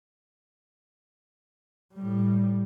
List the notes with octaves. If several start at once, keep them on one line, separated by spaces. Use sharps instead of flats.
A2 G3